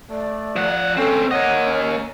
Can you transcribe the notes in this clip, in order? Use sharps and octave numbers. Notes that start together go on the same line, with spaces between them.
A3 D5
F3 F#5
C#2 C4 C#4 A4
A#3 C#5 D#5 F#5
C#4